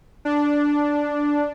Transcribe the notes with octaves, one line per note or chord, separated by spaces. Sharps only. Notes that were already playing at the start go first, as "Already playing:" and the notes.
D4